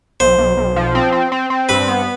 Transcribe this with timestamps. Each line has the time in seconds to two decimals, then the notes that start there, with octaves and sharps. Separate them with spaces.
0.20 B1 C5
0.38 B1
0.57 B1
0.76 F3
0.95 C4
1.12 C4
1.32 C4
1.50 C4
1.69 G2 B4
1.88 B3